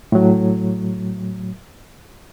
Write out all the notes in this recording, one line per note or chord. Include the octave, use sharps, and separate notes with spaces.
A2 F#3